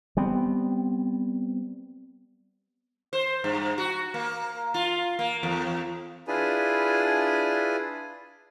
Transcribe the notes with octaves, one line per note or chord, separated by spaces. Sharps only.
G3 B3 C4
C5
G2
F#4
A#3
F4
A#3
E2
D4 E4 F4 G#4 B4 G#5